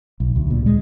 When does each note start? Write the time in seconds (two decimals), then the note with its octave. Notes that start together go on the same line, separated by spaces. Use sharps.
0.20 B1
0.36 D2
0.50 A#2
0.66 G#3